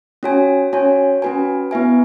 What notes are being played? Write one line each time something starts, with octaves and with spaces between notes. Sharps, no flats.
C#4 F#4 C#5 G#5
C#4 F#4 C#5 G#5
C#4 F#4 B4 G#5
B3 E4 B4 E5 G#5